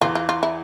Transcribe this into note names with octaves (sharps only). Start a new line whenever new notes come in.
E2 E3 F4
F4
F4
E4